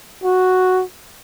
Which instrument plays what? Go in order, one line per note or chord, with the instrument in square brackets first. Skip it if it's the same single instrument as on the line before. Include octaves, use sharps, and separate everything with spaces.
[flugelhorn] F#4